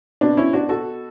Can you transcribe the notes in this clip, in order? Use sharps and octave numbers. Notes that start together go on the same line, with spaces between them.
B2 D4
C#4 E4
D4 F#4
F#4 A4